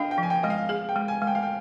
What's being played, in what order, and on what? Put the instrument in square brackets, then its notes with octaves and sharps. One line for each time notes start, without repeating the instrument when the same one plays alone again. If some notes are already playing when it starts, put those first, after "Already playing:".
Already playing: [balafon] D4 [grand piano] D#5 F5 G5
[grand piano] G5
[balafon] F3
[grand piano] G#5
G5
[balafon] G#3 [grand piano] D#5
[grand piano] F5
[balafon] G#4 [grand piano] F5
[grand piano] G5
[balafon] G#3
[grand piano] G#5
[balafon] G#3
[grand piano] G5
F5
G5